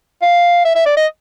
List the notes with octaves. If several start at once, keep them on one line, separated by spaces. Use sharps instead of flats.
F5
E5
E5
D5
D#5